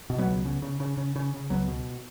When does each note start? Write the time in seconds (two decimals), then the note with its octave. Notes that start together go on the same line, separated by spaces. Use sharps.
0.10 B2
0.18 F#3 B3
0.27 C#2
0.45 C#3
0.62 C#3
0.80 C#3
0.97 C#3
1.16 C#3
1.34 C#3
1.50 C#2 F#3 B3
1.68 B2